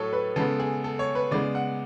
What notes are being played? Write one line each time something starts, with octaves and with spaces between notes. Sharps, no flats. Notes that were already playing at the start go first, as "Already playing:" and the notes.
Already playing: A2 F#3 A3 A4 C#5
B4
C#3 G#3 B3 A4
G#4
A4
C#5
B4
C#3 G#3 B3 D5
F#5